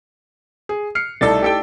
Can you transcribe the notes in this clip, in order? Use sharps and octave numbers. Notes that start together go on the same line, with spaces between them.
G#4
F6 C7 C#7
C2 A3 D#4 E4 A4 D5 A6
G4 A4 G5